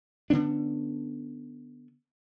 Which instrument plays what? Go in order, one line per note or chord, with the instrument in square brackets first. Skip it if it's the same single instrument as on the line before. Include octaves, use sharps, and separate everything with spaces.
[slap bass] D3 B3 C#4 D4